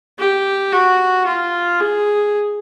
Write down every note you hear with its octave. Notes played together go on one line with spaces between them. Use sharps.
G4
F#4
F4
G#4